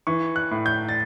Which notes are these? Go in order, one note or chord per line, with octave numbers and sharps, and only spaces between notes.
E3 C#6
F#6
A2
G6
A6